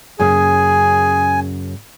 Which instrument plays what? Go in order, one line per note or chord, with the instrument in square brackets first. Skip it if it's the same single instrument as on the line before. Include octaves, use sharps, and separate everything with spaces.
[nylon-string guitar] F#2 C#3 A#3 [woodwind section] G#4 [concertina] G#5